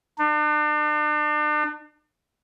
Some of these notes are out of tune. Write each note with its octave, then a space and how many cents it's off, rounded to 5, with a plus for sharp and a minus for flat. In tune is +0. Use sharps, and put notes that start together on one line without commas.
D4 +40